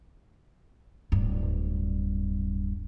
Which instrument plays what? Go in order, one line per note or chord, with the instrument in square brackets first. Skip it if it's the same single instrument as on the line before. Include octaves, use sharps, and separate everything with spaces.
[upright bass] D1 G2